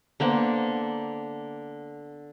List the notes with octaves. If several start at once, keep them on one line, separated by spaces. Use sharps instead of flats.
D3 A#3 B3 C5